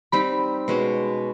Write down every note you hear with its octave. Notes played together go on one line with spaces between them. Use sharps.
G3 C4 D#4 G4 B5
B2 G#3 C#4 F#4